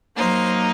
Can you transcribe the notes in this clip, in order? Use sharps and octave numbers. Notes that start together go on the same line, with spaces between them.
F#3 A#3 D#4 C5